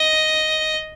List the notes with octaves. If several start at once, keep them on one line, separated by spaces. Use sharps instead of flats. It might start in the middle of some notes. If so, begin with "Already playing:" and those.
Already playing: D#5